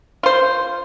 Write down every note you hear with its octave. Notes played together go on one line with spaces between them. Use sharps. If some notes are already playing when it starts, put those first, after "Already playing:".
F4 C5